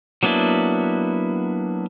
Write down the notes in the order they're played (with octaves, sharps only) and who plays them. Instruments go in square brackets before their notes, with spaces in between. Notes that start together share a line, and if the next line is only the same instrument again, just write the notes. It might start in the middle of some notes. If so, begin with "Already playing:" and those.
[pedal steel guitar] F#3 A#3 B3 D4 E4